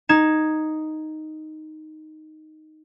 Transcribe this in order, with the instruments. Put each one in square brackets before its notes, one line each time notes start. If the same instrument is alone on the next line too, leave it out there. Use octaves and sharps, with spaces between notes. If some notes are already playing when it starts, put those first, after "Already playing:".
[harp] D#4 G#6 E7